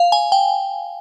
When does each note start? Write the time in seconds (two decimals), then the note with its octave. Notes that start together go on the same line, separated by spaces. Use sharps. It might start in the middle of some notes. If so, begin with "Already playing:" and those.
Already playing: F5
0.12 G#5
0.32 G5